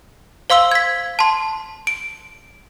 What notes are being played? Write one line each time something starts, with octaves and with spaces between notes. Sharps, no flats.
C5 F5 C6 E6 G7
G#6 B6
A5 C6
D7